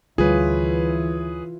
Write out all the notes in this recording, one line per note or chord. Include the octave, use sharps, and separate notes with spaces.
D2 E3 G3 F4 G#4 B4 C#5